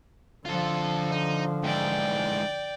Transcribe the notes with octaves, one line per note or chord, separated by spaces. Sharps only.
D3 F3 F4 A4
D#4
G#2 E3 D5 G5